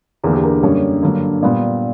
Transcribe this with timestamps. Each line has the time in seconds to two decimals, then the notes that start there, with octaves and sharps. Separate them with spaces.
0.24 E2 D3 A#3 A#4
0.33 G4
0.44 A#4
0.63 F#2 D3 G3 A#3 C#5
1.03 G2 D3 F#3 A#3
1.42 A#2 G3 B3